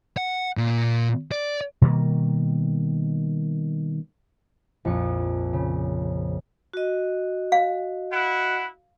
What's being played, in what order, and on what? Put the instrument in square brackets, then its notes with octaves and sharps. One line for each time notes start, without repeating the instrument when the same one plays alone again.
[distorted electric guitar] F#5
A#2
D5
[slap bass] B2 D#3 G3 A#3
[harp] A#1 F2 C#7
C#3
[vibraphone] F#4 D#5
[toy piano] F5
[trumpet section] E4 F#5